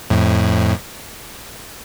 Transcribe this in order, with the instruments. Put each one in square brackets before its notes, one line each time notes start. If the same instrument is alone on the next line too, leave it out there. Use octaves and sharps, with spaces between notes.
[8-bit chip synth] F2 A2